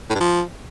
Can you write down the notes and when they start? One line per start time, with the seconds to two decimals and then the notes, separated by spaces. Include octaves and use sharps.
0.10 A2
0.15 G2
0.20 F3